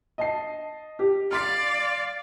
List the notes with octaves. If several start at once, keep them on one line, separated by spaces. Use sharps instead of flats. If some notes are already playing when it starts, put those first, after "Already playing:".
D#5 A5 C7
G4
D5 F5 C6 F6